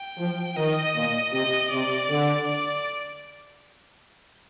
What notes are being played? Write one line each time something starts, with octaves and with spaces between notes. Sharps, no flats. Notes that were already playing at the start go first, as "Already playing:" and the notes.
Already playing: G5
F3
D#3 D#5
A#2
C3 D#5
C3 D5
D3
D5